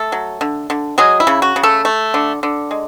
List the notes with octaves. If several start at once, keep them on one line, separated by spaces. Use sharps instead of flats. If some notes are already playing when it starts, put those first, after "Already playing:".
Already playing: A3 A4
F#3
D3
D3
F#3 G#3 G#4
E4
C#3
F#4
C#3
A3 A4
A3
D3
D3
G#3